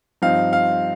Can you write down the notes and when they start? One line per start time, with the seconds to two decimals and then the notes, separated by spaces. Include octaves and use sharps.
0.22 G2 F3 C4 D#4 F5
0.53 F5